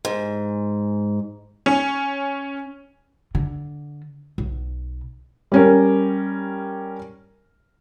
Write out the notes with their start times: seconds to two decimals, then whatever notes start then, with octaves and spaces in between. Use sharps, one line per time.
0.05 G#2
1.66 C#4
3.35 D3
4.38 B1
5.52 G3 C#4 A#4